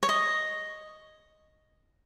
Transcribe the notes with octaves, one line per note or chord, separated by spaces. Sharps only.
C#5
D#5